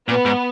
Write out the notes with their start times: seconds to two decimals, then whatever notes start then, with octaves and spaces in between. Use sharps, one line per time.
0.08 A#2 B3
0.25 G#2